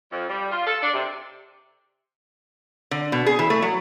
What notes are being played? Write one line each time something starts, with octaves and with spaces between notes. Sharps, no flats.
F2
G3
F4
A4
D4
C3
D3
B2
G#4
E3
A3
F#3